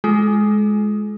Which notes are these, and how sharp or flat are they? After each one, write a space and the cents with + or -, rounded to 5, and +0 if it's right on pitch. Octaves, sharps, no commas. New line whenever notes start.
G#3 +10 F4 +0 A4 -45